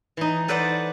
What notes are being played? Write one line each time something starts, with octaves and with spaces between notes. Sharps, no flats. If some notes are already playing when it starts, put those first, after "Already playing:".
E3 D#4
A4 B4 C5 D5 F#5